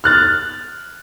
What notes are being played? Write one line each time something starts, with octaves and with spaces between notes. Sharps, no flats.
F6 F#6 A6